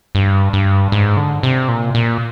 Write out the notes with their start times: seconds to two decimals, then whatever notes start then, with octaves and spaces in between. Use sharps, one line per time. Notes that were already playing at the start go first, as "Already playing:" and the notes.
0.15 G2
0.53 G2
0.92 G#2
1.17 D3
1.43 C3
1.68 A#2
1.95 A#2